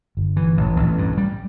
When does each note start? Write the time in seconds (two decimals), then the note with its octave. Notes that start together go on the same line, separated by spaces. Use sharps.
0.17 G1
0.37 E3
0.57 A1
0.76 A1
0.97 G2
1.17 G3